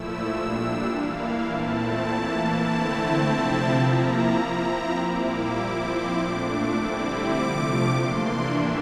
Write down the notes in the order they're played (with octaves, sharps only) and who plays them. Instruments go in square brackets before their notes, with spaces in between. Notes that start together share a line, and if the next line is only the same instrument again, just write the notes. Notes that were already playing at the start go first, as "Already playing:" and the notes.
Already playing: [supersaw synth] A#2 F3 A3 E4 E6
A#2 G3 D4
E3 A#3 E4 F5
A#2 A3 C4 E4 A5
E3 A#3 E4
D3 A3 C4 E4 A5
C3 F3 C4 E4
F3 A#3 E4 A#5
F3 C4 E4 A#5
A#2 G3 A#3 E4 D6
E6
F3 C4 E4 D6
C6
A#2 A3 D4 D6
D3 G3 C4 E4
C3 F3 A3 D6
E3 A#3 D4 C6
D5
A2 E3 G3 A#3 D4 E5